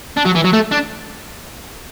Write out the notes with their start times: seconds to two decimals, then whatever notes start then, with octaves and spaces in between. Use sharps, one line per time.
0.17 D4
0.25 F#3
0.35 E3
0.44 F#3
0.53 A3
0.71 D4